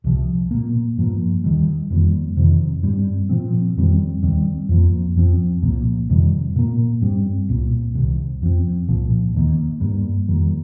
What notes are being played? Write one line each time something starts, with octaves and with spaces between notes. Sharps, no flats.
C2 C3 F3
A#2 A#3
G2 F3 A#3
D#2 D#3 G3
F2 D#3 G3 A#3
F2 C3 D#3
G2 G3 C4
A#2 F3 C4
F2 D#3 G3 C4
D#2 D#3 G3 C4
F2 F3 A#3
F2 F3 C4
C2 A#2 F3 A#3
F2 C3 D#3 G3
A#2 A#3
G2 G3 C4
C2 A#2 A#3
C2 C3 D#3
F2 F3 C4
C2 A#2 F3
D#2 D#3 A#3
G2 G3 A#3
F2 D#3 G3 A#3